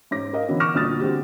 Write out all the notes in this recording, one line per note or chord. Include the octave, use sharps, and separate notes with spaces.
G#2 C#4 D6 A#6
A#4 D#5 F5
D3 E3 B3 C#4 E4 F#4
C#6 D6 F6 A#6 E7
G1 D2 A#2 D#6 F6 A6
D3 G#3 C4 F#4 G4